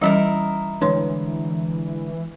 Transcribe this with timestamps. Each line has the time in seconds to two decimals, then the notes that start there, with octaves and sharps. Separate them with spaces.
0.01 E3 G3 C#4 D#4 E4 A#4
0.81 D3 E3 G#3 D4 B4 C#5 C6